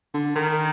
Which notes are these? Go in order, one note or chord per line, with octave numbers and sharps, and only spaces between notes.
D3
D#3